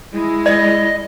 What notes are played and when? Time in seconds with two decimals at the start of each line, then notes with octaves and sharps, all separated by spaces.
0.13 G#3 E4
0.46 D5 D#5